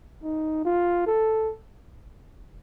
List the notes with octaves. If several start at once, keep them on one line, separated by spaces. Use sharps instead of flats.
D#4
F4
A4